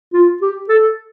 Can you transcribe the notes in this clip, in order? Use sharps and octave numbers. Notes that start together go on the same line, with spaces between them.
F4
G4
A4